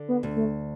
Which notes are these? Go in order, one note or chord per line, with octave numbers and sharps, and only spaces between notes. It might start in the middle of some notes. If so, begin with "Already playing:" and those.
Already playing: D3
B3
D2
A3